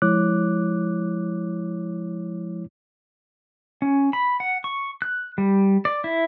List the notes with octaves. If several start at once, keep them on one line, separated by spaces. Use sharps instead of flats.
F3 G#3 E4 C#5 D6 F#6
C#4
B5
F#5
C#6
F#6
G3
D5
E4